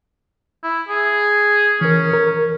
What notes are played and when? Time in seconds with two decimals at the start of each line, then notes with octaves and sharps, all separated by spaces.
0.63 E4
0.88 G#4
1.81 E3 C#4 A#4
2.13 A#4